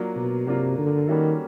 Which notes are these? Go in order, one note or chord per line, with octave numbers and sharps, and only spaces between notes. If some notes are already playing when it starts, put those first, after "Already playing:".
Already playing: F#3 A#3 D4 F4
B2
C3 F#3 A#3 D4 F4
D3
D#3 G3 A#3 C#4 F#4 A4